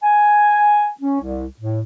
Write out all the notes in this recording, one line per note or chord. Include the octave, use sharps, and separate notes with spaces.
G#5
C#4
C2
A2